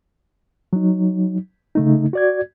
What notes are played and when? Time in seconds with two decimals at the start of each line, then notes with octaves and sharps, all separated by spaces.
0.73 F#3 D#4
1.75 C#3 A3 D#4
2.13 F#4 D5 G#6